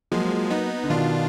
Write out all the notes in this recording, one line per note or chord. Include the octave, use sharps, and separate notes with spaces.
F3 F#3 G#3 A#3
B3 D#4
D3
B2 D#3 D4 F4